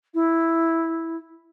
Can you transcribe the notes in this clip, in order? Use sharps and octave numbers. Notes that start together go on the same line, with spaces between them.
E4